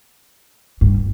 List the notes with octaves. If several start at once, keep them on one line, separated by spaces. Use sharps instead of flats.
G2